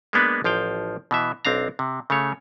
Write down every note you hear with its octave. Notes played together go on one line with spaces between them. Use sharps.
G#3 A#3 B3 D4 B4
A1 F3 F5 G5
B2 E3 E5
B1 C4 D4 F5 A#5
C3
C#3 A3 C#5